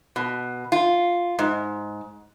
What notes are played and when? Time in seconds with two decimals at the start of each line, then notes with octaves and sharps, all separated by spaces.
0.16 B2
0.72 F4
1.39 G#2